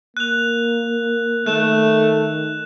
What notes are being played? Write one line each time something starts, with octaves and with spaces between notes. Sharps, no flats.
A#3 F#6 F7
D#3 A3 F#6 E7